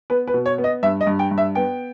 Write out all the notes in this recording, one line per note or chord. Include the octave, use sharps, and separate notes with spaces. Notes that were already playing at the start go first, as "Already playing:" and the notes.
B3 B4
B4
B2
C#5
B3
D#5
G2 E5
D#5
G2
G5
G2
E5
B3 G5